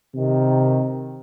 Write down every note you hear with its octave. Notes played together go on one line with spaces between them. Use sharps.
C3 D#3